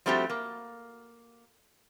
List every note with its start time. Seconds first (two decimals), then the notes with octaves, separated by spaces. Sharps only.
0.06 F3 G3 A3 C4 F#4 G4
0.30 A#3